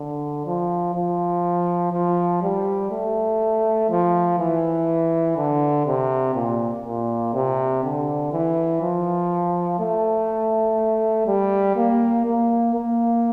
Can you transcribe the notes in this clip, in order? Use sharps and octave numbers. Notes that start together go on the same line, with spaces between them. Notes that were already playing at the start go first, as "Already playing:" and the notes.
Already playing: D3
F3
F3
F3
G3
A3
F3
E3
D3
C3
A#2
A#2
C3
D3
E3
F3
A3
G3
A#3
A#3
A#3